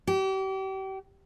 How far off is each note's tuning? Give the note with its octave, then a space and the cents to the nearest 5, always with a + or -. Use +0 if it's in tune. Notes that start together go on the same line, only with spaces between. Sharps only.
G4 -35